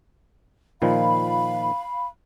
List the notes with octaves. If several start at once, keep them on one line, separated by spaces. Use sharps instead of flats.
A#2 D#3 F3 F5 B5